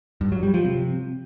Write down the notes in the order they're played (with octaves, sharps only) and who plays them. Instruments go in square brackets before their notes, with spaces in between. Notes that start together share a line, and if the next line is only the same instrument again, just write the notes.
[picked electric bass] G2
F#3
G3
F3
C3